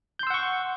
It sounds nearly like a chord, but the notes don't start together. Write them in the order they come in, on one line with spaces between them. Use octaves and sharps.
G6 C6 E6 F#5 C#6